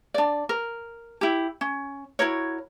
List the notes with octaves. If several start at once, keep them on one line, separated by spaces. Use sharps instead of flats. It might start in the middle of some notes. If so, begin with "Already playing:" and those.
D4 D5
A#4
E4 G4
C#4
E4 F#4 A#4 C#5